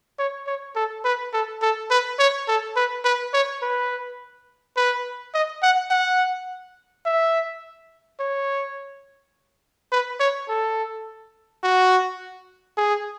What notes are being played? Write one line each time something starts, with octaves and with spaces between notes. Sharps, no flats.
C#5
C#5
A4
B4
A4
A4
B4
C#5
A4
B4
B4
C#5
B4
B4
D#5
F#5
F#5
E5
C#5
B4
C#5
A4
F#4
G#4